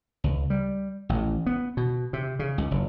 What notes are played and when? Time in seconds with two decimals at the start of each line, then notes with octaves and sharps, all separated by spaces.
0.24 C#2
0.50 G3
1.09 A1
1.47 B3
1.77 B2
2.13 C3
2.39 C#3
2.58 C#2
2.71 F#1